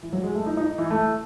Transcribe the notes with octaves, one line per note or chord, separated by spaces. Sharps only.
E3
F#3
G#3
A3
D#4
D#4
E3
A3